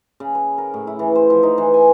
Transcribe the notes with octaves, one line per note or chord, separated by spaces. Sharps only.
C#3
B4
A#4
A2
E4
E3
C5
F3
D#4
E3
G#5